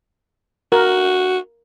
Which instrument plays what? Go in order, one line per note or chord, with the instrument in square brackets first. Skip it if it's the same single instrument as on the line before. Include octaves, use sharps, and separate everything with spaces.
[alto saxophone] F#4 [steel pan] A#4